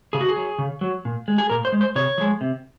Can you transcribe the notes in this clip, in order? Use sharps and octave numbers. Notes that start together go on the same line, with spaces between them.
C#3 G#4
F#4
G#4
F#3
C#3
F#3
A#2
G#3
G#4
A#2 A#4
C5
G#3
C5
C3 C#5
F3 G#3
C3